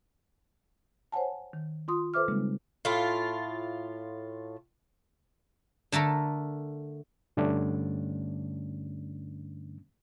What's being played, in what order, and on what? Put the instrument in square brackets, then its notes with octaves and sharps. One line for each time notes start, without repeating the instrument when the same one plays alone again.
[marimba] C5 C#5 F#5 G#5 A5
D#3
F4 C6 D#6
A4 B4 C5 E5 D6 F6
C#3 G3 G#3 A#3 C4 D#4
[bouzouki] A2 F4
[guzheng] D3 A3 A4 A#4
[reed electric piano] G2 D3 G3 A3 C#4 D4